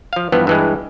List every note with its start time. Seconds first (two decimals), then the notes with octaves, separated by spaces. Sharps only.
0.13 F3 F5
0.32 G2 E3 F3 B3
0.47 G2 E3 G#3